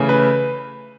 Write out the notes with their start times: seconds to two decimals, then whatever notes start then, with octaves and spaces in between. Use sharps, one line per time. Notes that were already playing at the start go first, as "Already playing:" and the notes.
Already playing: C#3 E3 A3 C#4
0.09 B4